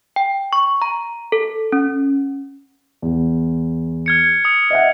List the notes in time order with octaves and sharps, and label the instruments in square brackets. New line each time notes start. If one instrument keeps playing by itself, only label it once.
[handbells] G5
C#6
A#5
A4
C#4
[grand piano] E2
[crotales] F6 G#6 C#7
D#6 C#7
[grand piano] D#5 E5 F#5